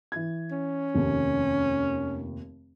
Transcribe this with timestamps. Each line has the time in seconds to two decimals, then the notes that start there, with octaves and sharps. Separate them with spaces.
0.12 E3 G#6
0.51 C#4
0.94 F1 D#2